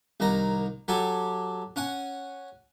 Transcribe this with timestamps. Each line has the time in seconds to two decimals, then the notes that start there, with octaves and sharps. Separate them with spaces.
0.20 C2 D#3 A#5
0.88 F#3 G4 A4 G#5
1.76 C#4 F#5 G#5